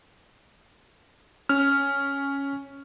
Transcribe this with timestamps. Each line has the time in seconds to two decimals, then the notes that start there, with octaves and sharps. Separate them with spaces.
1.49 C#4 F6